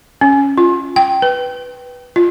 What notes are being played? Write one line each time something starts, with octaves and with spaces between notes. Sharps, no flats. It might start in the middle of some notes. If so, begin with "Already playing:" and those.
C#4
F4
G5
B4
F4